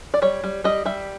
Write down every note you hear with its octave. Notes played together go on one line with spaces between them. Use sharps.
D5
G3 C#5
G3
G3 D#5
G3 E5